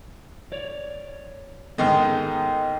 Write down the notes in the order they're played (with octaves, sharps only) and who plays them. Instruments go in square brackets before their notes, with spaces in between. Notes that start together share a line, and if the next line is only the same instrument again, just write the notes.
[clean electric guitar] C#5 D5
[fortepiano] G#2 D#3 [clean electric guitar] B3 A4 A#4